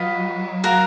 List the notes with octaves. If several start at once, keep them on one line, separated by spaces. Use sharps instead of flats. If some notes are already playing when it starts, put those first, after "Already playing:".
Already playing: F#3 F4 B4 D#5
F#4 A#4 F5